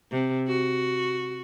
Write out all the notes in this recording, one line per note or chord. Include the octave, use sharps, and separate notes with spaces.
C3
F#4